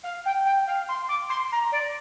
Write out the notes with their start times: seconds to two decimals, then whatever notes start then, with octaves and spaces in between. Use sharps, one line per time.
0.03 F5
0.25 G5
0.45 G5
0.67 F5
0.88 C6
1.08 D6
1.29 C6
1.51 A#5
1.71 D5